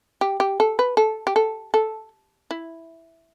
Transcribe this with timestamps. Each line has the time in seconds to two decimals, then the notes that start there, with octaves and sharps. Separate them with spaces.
0.21 G4
0.40 G4
0.60 A4
0.79 B4
0.97 A4
1.27 G4
1.36 A4
1.74 A4
2.51 E4